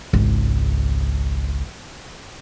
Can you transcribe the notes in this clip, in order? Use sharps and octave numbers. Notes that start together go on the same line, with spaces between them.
G#1 C#2